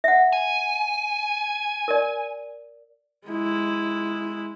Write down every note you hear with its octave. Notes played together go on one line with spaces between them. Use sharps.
E5 F#5
G#5
A#4 D5
G#3 E4